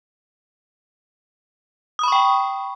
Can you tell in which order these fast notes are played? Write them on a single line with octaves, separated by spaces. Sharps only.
D#6 B5 C#6 G5